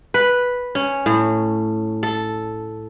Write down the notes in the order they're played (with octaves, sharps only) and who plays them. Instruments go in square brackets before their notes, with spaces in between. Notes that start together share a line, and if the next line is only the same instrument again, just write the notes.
[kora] B4
C#4
A2
A4